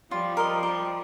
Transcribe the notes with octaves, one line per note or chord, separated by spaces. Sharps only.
F3 G3 F4
A#4 D#5
G4